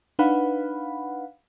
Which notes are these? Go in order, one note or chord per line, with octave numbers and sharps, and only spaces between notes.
D4 D#4 B4 F5 F#5 B5